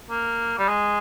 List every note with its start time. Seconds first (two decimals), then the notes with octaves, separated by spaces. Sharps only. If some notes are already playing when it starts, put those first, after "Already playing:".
0.10 A#3
0.59 G3
0.68 G#3